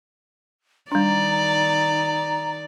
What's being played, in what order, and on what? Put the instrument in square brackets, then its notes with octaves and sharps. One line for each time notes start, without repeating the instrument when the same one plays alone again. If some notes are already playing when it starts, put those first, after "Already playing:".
[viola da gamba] D#3 D5 [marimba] G3 D4 [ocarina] A#5